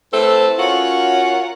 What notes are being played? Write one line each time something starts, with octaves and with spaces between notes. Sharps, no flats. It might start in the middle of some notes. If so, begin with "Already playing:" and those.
A2 A3 C4 A4 B4 C5
C#4 F4 F#4 A#4 C#5 F#5